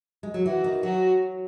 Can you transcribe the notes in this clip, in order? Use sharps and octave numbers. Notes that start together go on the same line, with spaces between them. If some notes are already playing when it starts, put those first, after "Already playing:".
G#3
F#3
E3 F#4
D#3
F#3 F#4